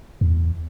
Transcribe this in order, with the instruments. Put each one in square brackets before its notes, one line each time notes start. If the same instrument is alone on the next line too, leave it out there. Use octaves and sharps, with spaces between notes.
[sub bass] E2